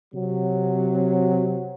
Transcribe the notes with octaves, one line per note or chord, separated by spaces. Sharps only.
C3 F#3